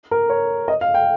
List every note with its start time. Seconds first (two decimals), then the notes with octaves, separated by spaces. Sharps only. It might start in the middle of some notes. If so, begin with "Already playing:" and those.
0.11 A#4
0.30 C#5
0.68 D#5
0.81 F5
0.94 G5